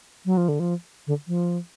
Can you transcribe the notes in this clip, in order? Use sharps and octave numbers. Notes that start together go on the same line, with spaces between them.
F#3
F3
D3
F3
D3
F3